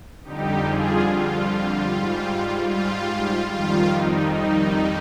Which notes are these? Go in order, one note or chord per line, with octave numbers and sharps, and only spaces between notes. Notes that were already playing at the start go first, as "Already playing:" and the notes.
F2 D3 G3 D#4 G4
F4 G#4
F4
G#2 G3
F4
F2 D#3 G3 F4
D#4
D#4